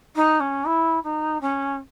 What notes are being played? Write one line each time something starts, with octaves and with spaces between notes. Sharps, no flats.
D#4
C#4
E4
D#4
C#4